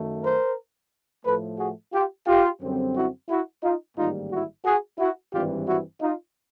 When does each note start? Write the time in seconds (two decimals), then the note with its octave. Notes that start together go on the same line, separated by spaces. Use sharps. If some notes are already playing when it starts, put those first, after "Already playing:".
Already playing: F#2 D#3 F#3 A3
0.23 A#4 C5
1.25 A2 F3 A3 A4 B4
1.58 F#4 G#4
1.93 F4 G4
2.27 F4 G4
2.61 F#2 D3 G3 C4
2.94 E4 F#4
3.29 E4 F#4
3.63 D#4 F4
3.97 A1 G#2 D#3 G3 A#3 D#4 F4
4.31 E4 F#4
4.65 F#4 G#4
4.99 E4 F#4
5.32 G#1 G2 E3 G3 C4 F4 G4
5.67 E4 F#4
6.01 D#4 F4